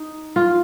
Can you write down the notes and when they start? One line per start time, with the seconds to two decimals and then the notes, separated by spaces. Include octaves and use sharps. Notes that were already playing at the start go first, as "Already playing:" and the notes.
Already playing: D#4
0.36 F4